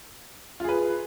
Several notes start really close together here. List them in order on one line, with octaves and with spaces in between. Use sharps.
F4 G#4 B4